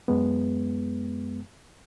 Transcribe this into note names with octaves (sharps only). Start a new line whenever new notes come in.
F#2 G#3 B3